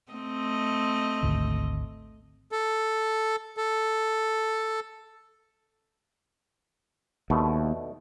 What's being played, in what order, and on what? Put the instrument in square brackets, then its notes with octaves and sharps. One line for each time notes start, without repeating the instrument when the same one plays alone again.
[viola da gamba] A3 C4 D#5
[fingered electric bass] G#1 D2
[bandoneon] A4
A4
[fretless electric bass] D#2 [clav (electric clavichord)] B2 D3 A3